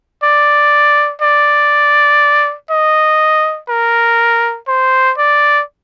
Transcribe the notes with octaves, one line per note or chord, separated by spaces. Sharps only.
D5
D5
D#5
A#4
C5
D5